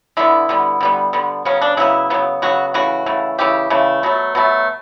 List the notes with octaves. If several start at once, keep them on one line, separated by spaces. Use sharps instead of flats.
D3 G3 B3 E4
D3 G3 B3
D3 G3 B3
D3 G3 B3
C#3 F#3 B3 C#4
D4
C#3 F#3 B3 E4
C#3 F#3 B3
C#3 F#3 B3 F#4
C#3 E3 A3 F#4
C#3 E3 A3
C#3 E3 A3 G4
C#3 E3 A3
B2 F#3 A3
B2 F#3 A3